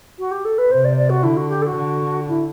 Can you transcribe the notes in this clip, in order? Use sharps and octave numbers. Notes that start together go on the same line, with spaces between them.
F#4
G4
A4
B4
C3 C5
D5
D5
F#4
D3 E4
F#4
G4
A4
F#4
D3
E4